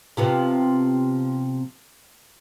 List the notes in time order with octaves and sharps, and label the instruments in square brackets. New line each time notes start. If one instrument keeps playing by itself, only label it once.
[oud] C3 F3 B3